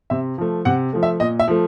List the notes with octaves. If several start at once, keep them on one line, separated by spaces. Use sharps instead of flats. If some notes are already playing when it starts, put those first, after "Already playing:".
C3 E5
F3 A3
C3 F#5
F3 A3
E5
A#2 D#5
E5
F3 A3